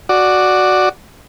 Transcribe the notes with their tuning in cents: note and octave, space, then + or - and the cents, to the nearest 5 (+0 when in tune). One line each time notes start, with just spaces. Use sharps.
F#4 +0 D5 +5